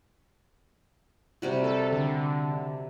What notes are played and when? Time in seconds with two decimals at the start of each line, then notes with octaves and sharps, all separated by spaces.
1.42 C3 G3 F#4
1.64 A4
1.93 D3